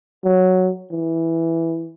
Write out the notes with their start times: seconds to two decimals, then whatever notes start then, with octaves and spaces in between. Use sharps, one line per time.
0.24 F#3
0.91 E3